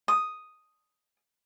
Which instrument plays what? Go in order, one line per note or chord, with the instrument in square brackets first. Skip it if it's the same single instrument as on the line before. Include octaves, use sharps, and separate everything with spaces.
[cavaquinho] D#6